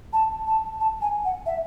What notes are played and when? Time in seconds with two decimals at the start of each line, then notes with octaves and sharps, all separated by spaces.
0.13 A5
0.47 A5
0.80 A5
1.01 G#5
1.25 F#5
1.46 E5